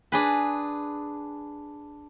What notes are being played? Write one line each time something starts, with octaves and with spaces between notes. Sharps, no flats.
D4 G#4 B4